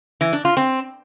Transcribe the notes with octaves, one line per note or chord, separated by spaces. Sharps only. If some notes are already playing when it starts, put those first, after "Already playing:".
E3
D4
F4
C4